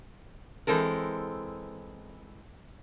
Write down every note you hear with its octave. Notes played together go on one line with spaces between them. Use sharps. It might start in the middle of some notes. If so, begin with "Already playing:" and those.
E3 G#3 C4 A4 A#4